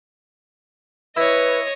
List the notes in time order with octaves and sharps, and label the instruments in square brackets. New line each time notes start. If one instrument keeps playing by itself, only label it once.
[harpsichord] E4 [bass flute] B4 [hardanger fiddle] C#5 D#5